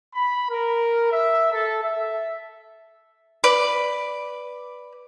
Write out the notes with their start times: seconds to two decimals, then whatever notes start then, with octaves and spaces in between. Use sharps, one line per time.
0.14 B5
0.50 A#4
1.12 E5
1.53 A4
1.82 E5
3.44 B4 D5